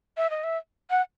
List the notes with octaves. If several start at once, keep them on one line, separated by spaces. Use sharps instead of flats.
E5
D#5
E5
F#5